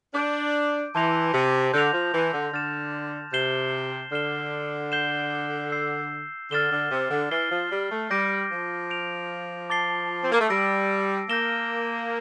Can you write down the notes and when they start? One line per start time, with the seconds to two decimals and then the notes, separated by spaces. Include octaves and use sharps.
0.14 D4 D6 G6 D7
0.95 E3 A5 C6 G6 A#6 F7
1.34 C3
1.74 D3 G6 A#6 F7
1.93 F3
2.14 E3
2.33 D3
2.53 D3 F6 A6 E7
3.33 C3 G6 C7 E7 G7
4.12 D3 F6 C7 E7 G7
4.92 G6 C7 E7 G7
5.72 E6 G6 C7
6.51 D3 F6 A6 E7 G7
6.71 D3
6.91 C3
7.10 D3
7.31 E3 F6 A6 C7 G7
7.51 F3
7.71 G3
7.91 A3
8.10 G3 D6 G6 A#6 D7
8.51 F3
8.90 G6 D7 F7
9.70 A5 D6 A6 C7 G7
10.24 C4
10.32 A#3
10.41 A3
10.49 G3 E6 A#6 D7
11.29 A#3 G6 A#6 E7 G7